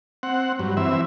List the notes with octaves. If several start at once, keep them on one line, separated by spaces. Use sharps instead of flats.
C4 F#5
G2 F#3
E3 C4 E5